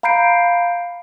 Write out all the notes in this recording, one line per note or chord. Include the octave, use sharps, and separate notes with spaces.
F5 A#5 B5 G6 C7 D7